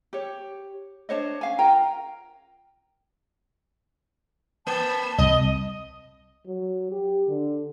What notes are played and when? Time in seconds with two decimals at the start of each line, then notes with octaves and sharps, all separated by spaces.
0.13 G4 C#5
1.09 D4 C5 C#5 D#5
1.41 C#4 F5 G#5
1.58 F4 A#4 G5 A#5
4.67 A#3 A5 B5
5.18 C2 D#5
6.46 F#3
6.91 G4
7.28 D3